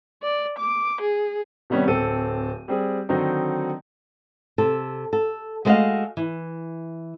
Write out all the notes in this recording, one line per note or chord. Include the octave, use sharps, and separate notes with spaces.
D5
D6
G#4
C3 D#3 G3 B3 C#4
D1 C4 A4 D#7
G3 C4 G#4
D3 D#3 F#3 C4 D#4
C3 A4
A4
G#3 A3 B3 F#4 D#5 F5
E3